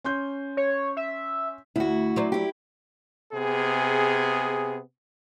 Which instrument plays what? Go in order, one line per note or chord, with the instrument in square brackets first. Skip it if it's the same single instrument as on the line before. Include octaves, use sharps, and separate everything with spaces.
[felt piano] C#4 C6 G6
[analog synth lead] C#5
E5
[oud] D2 [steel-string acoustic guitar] E4 F#4
[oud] F#3 C5 D5
[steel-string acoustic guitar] E4 G4
[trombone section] C3 B3 G#4